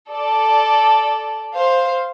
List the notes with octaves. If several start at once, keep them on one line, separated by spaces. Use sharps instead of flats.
A4 D5
C5 F5